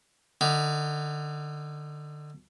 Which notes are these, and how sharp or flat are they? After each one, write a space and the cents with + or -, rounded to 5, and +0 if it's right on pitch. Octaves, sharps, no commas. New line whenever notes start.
D3 +25 D#4 +10